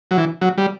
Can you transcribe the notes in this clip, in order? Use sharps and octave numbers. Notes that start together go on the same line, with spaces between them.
F#3
E3
F#3
G3